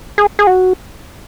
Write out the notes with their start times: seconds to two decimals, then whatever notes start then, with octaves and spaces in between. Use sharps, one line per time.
0.18 G#4
0.39 G#4
0.47 F#4